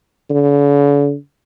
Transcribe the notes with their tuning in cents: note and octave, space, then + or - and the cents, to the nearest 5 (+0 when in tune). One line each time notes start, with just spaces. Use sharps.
D3 -45